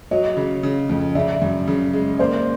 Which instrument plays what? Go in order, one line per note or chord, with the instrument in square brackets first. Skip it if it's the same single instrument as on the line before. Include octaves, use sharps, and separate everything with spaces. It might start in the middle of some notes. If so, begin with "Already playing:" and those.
[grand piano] F#3 [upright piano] C#5 D#5
[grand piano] C#3
C#3
F2
[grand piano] C#3 [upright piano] D5 E5
[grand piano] F#2
C#3
G#3
[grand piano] A#3 [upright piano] C5 D5